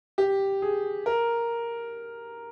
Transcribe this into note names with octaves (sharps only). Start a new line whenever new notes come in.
G4
G#4
A#4